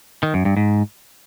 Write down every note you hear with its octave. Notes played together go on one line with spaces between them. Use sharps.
D#3
F#2
G2
G#2